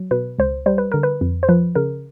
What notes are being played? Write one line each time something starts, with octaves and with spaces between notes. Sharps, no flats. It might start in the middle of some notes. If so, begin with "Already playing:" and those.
Already playing: F#3
B2 B4
C#2 C5
G3 C5
B4
D3 A#4
B4
F2
C5
F3 B4
C#3 A#4